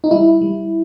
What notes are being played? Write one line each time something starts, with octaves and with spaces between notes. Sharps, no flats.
D#4
G3 E4
G3